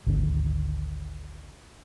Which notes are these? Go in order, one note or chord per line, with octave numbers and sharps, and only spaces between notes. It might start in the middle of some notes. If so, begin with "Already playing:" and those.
G#1 D2